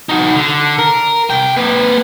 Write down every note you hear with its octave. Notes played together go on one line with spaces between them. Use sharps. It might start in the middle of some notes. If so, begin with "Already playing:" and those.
D#4 F#4
D3
A#4
C2 G5
A#3 B4